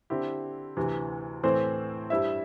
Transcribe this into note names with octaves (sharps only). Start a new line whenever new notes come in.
D3 C4 E4 G4
D2 C3 E3
A2 E3 C4 A4 C5
G2 G3 E4 C5 E5